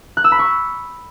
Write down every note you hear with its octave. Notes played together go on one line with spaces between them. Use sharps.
F#6
E6
B5
C#6